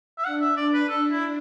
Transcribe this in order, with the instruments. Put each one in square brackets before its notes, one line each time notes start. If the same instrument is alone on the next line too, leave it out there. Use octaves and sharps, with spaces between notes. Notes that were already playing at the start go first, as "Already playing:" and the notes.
[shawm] E5
[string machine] D4 [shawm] F#5
[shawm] E5
D5
B4
A4
E4